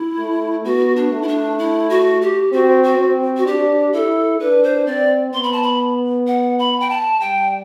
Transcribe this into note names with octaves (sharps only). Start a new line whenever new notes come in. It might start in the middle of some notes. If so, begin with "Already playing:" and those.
Already playing: E4
A3
B3 F#4
D4
A3
E4
D4
E4
F#4
G4
C4 F#4
F#4
C4
F#4
D4 G4
E4 A4
D4 B4
C5
C4 D5
B3 C6
B5
A5
B5
F#5
B5
G5
A5
G3 G5